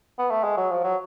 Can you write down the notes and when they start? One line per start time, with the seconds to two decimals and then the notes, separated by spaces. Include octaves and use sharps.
0.19 B3
0.30 A3
0.44 G#3
0.57 F#3
0.71 F3
0.84 F#3